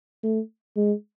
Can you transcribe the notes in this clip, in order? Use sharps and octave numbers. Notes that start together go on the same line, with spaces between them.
A3
G#3